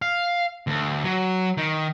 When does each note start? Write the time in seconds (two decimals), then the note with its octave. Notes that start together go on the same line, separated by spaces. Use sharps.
0.02 F5
0.67 D2
1.04 F#3
1.57 D#3